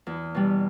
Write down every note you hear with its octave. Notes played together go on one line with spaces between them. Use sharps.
E2
B2 G3